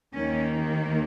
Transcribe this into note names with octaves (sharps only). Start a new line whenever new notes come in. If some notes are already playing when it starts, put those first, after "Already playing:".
D#2 D#3 A#3 C#4